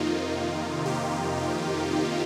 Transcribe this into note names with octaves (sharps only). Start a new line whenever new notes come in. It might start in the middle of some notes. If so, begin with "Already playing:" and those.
Already playing: F2 C3 D#3 A#3 D#4 F4
G4